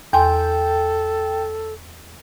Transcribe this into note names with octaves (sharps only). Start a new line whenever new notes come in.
E2 A4 G5 G#5 C6